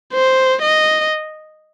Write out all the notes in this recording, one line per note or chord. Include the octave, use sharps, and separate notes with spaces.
C5
D#5